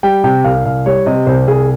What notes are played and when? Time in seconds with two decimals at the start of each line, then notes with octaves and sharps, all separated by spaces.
0.03 G3 G5
0.24 C3 G5
0.44 C2 F5
0.65 C2 F5
0.86 G3 C#5
1.06 C3 D#5
1.27 C2 C5
1.48 C2 G#4